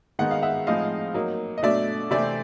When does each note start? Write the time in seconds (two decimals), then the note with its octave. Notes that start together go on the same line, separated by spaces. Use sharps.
0.19 D#3 G#3 B3 D#4 F#5
0.31 F5
0.42 E5 F#5
0.67 A2 F3 G#3 C4 D#4 D#5 F5
1.14 F#3 A#3 D#4
1.58 D#5
1.63 B2 F#3 A3 D4 D5 E5
2.11 C3 E3 A3 C4 D5 E5